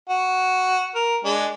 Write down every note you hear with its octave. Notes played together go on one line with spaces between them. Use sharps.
F#4
A#4
G#3 D4